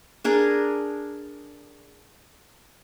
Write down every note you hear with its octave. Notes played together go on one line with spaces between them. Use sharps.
D4 G#4 A#4